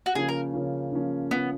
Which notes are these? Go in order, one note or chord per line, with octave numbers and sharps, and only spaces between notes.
F#4
C#3 F3 A#3 C#4 G#4
A#4
C#3 F3 A#3 C#4
C#3 F3 A#3 C#4
C#3 F3 A#3 B3 C#4